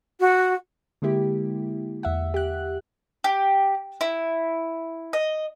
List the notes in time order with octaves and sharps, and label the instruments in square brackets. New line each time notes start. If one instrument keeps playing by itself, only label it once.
[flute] F#4
[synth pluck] D3 G#3 A#3 E4 G4
E2 E5 F#5
G4 F#6
[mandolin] G4
E4
D#5